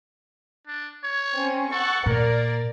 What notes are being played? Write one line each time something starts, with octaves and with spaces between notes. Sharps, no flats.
D4
C#5
C4 C#4
A4 F#5 C#6
A#2 A#3 A#4 D5